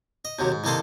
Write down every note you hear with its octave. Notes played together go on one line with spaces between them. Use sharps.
D#5
D#2 C3 F#3
G#2
C2 D#3 A#3 A4 D#5 C6